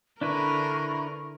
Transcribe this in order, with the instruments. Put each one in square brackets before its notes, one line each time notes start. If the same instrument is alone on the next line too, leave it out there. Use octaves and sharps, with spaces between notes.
[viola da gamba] D3 A#4 [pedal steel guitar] D4 E4 B4 [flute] C#6